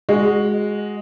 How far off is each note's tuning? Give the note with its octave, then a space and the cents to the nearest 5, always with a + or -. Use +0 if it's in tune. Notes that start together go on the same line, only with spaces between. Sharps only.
G#3 +0 F#4 +0